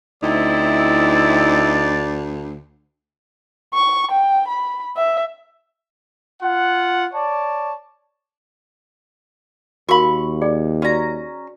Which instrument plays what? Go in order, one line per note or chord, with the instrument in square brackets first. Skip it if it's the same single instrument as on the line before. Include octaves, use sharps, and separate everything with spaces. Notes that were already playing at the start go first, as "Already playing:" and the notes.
[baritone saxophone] D2 [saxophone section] C4 E4 [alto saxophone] D#4 [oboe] D5
[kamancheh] C#6
G5
B5
E5
[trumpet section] F4 F#5
C#5 D5 A5
[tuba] D#2 [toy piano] F#4 A#4 F5 [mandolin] B5 C#6
[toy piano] G#4 D5 G5
[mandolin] C#4 A#5 [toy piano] F#4 D5